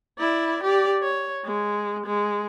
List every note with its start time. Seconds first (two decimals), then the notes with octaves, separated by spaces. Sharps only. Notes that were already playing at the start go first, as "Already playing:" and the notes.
0.19 E4 D5
0.63 G4 D5
1.02 C#5
1.45 G#3
2.06 G#3